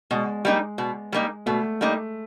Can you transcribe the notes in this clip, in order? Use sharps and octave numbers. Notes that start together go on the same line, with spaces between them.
B2 G#3
G3 A#3 D#4
B2
G3 A#3 D#4
B2 A3
G3 A#3 D#4